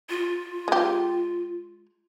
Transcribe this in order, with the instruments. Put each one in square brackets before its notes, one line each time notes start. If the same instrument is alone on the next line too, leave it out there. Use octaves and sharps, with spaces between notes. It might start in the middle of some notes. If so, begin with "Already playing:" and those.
[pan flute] F4
[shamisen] G#3 G4